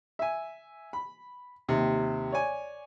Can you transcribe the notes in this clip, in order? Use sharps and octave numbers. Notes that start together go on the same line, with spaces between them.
E5 G#5
B5
D#2 C3
C#5 D5 G#5